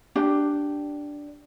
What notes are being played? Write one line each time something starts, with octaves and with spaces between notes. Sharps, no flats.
D4 G4